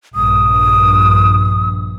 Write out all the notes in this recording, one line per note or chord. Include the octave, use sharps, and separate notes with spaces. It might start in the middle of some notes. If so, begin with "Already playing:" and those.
A#1 G2 D#6